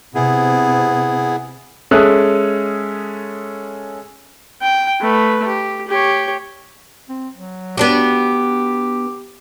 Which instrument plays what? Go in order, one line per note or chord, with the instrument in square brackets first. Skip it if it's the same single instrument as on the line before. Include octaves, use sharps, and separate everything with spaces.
[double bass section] C3 [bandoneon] B3 E4 G#4
[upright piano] G#3 C#4 A4 E5 D#6 F#6
[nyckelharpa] G5
A3 B4
G4
G4 C#5
[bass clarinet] C4
F#3
[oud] B3 D4 F#4 [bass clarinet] G4